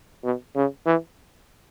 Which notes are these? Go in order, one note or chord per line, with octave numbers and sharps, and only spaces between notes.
B2
C#3
E3